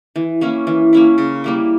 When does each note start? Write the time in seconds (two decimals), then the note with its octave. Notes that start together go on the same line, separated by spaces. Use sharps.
0.16 E3
0.41 A#3 C#4 E4
0.67 E3
0.93 A#3 C#4 E4
1.18 C#3
1.44 G3 A#3 E4